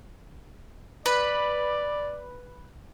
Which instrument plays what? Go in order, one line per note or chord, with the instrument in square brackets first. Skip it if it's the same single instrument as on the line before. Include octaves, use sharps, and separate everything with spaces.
[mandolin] B4 [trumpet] D5